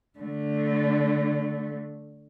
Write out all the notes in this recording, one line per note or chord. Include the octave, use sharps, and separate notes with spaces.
D3 A3